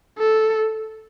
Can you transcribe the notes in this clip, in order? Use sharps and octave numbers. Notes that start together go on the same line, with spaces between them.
A4